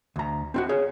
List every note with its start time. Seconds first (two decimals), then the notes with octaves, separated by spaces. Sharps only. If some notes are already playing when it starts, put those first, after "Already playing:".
0.16 D2 A#5
0.54 C4 F4 F#4
0.69 G#4 C#5